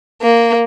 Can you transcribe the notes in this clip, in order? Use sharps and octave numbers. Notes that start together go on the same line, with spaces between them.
A#3